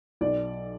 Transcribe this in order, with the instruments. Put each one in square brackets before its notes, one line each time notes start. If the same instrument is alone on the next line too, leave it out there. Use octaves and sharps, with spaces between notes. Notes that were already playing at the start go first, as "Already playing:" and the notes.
[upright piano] B1 D5